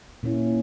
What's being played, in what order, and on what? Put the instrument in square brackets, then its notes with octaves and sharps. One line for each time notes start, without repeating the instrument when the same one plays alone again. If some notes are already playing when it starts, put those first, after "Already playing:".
[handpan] A#2 A#3 C#4 E4